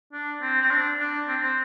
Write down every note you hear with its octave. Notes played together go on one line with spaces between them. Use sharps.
D4
C4
C4
D4
D4
C4
C4